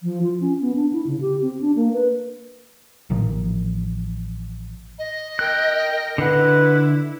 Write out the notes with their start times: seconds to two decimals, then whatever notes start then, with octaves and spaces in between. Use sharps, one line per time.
0.03 F3
0.23 F4
0.41 C#4
0.61 B3
0.76 D4
0.93 E4
1.07 C#3
1.21 G4
1.42 C4
1.61 D4
1.76 A#3
1.93 B4
3.10 A1 A#2 D#3 F3
4.99 D#5
5.39 A#4 G5 F#6
6.18 D3 E4 B4 F#5